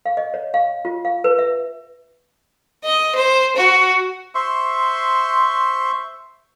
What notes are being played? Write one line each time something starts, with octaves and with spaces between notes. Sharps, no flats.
F5
D#5
C#5
F5
F4
F5
B4
E5
D#5
C5
F#4
C5 E5 C6 C#6